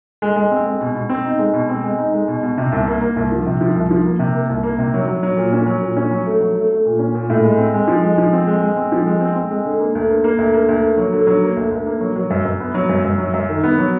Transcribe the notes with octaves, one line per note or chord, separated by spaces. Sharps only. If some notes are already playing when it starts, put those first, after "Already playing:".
G#3
G#3
C4
G#3
B2
B2
C4
D#4
G#3
B2
C4
G#3
D#4
G#3
B2
B2
C3
C2
A#3
A#3
C2
F3
C3
F3
C2
F3
A#3
C3
A#3
C2
A#3
C3
F#3
F#3
F#3
A#2
C#4
F#3
A#2
C#4
F#3
A3
F#3
A3
A3
A#2
C#4
A#2
A2
G#3
C4
G#3
F3
G#3
F3
C4
G#3
G#3
C4
F3
G#3
C4
C4
G#3
D3
A#3
D2
A#3
A#3
D2
A#3
D2
A#3
F#3
D3
F#3
A#3
D2
D2
A#3
F#3
F#3
F#2
F#2
B3
F#3
F#2
F#2
F#3
F#2
D#3
B3
F#3